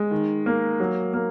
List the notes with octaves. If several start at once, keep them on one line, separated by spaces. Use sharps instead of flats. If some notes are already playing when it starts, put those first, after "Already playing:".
Already playing: G#3
D#3
A#3
F#3
A#3